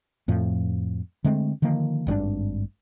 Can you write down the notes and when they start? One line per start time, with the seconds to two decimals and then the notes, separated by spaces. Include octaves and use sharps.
0.28 F2 A2 F3
1.24 D3 G#3 A3 C4
1.62 D3 D#3 F3 A#3
2.07 G#1 G2 C3 D4